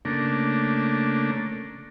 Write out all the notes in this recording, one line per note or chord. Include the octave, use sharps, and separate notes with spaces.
C#3 A3 A#3 D4